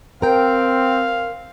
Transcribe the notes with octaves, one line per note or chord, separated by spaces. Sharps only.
C4 A#4 F5 G5